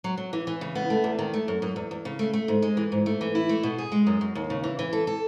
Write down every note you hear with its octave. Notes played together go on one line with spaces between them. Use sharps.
F#3
F#3
E3
E3
C#3
B3
A3
E2
D#3
A3
F#2
F#2
E2
E2
C#3
A3
A3
G#2
G#3
E3
G#2
A3
E3
E4
A3
B2
G#4
G#3
F#2
F#2
D#2
C#3
E3
E3
A4
A4